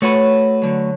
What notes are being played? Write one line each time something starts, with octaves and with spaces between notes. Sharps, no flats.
A3 F#4 B4 C#5 C#6
D3 F#3